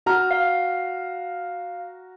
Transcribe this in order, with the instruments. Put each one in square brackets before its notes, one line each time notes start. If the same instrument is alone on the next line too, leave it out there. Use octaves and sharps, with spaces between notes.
[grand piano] F#4 A#5 F6
[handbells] F5